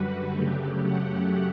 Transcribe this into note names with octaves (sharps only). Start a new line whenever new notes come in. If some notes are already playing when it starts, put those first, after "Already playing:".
Already playing: F#2 D3 G3 F#4 B4
F#2 C#3 F#3 A3 G4
F#5